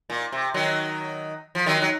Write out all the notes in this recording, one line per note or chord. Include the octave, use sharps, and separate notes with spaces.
A#2
C3
D#3 F#3
F3
D#3 F#3
F#3